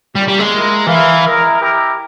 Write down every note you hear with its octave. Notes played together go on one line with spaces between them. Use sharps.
G3 A#3 C#4 F4
G3
G#3
A#3 E4 A#4
E3 E4 A#4 F5
G#3 E4 A#4 E5
E4 G4 A#4